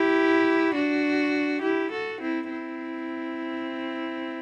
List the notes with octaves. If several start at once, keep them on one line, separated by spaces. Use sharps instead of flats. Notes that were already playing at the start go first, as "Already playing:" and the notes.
Already playing: E4 G4
D4 F#4
E4 G4
F#4 A4
C4 E4
C4 E4